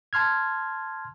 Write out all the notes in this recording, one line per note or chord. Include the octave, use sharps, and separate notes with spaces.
A5 C6 F6 G#6